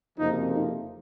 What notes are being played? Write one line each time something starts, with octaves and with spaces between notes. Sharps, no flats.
F#1 F2 C3 F3 A#3 D#4
D#4